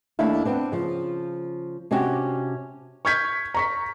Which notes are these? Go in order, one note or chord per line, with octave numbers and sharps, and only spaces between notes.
D#2 A3 D4 E4 E5 F5
B3 C4 D4
C#3 F3
C3 C#4 D4 F#4 G4
C#6 F6 G6 G#6 B6
A#5 C#6 B6